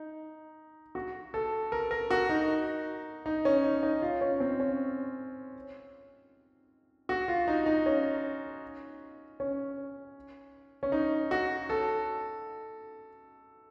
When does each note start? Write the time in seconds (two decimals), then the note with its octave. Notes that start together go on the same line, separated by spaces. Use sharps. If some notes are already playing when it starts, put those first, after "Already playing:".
Already playing: D#4
0.95 F#4
1.34 A4
1.72 A#4
1.91 A#4
2.11 F#4
2.29 D#4
3.26 D#4
3.45 C#4
3.64 D#4
3.83 D#4
4.02 F4
4.21 C#4
4.40 C4
4.60 C#4
7.09 F#4
7.28 F4
7.48 D#4
7.66 D#4
7.86 C#4
9.40 C#4
10.83 C#4
10.92 D#4
11.31 F#4
11.70 A4